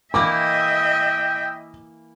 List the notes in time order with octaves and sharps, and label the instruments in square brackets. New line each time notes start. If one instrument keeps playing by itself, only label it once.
[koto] E3 A#3 E4 [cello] D#5 E5 [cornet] G5 [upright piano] D6